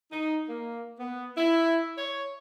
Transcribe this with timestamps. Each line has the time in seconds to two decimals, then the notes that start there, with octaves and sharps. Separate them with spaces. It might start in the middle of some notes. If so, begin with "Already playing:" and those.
0.11 D#4
0.49 A#3
0.99 B3
1.37 E4
1.98 C#5